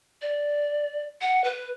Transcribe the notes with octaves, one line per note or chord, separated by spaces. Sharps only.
D5
F#5
B4